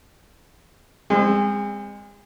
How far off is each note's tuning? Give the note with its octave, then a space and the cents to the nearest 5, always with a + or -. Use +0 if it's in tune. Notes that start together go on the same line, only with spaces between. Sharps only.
G#3 -35 C4 +0